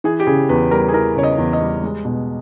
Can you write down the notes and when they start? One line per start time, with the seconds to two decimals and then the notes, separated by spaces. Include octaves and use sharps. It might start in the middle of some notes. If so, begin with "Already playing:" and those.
0.04 E3 G#4
0.20 G4
0.27 C#3 G#4
0.49 E2 B4
0.71 G3 A#4
0.88 G#4
0.93 E3 A#4
1.16 C#3 C#5
1.23 D#5
1.38 E2
1.53 D#5
1.61 G3
1.83 G#3
2.05 B2